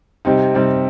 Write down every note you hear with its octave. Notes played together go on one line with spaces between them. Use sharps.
C3 G3 C4 D#4
C3 G3 C4 D#4